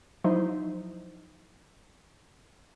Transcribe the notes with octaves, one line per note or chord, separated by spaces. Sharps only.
F3 F#3 D#4 E4 C5